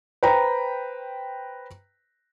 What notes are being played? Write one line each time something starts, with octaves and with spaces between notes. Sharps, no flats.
B4 C5 G5 A#5